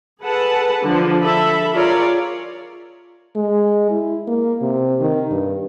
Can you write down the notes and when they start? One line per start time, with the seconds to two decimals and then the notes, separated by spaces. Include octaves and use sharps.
0.22 G#4 A4 B4 F#5 A5
0.83 D3 F3
1.22 A4 E5 B5
1.73 F4 G#4 A#4 C#5 D5
3.35 G#3
3.91 E4
4.27 A#3
4.61 C3
5.00 D#3
5.31 G2